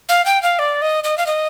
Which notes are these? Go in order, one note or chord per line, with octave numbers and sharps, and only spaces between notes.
F5
G5
F5
D5
D#5
D#5
F5
D#5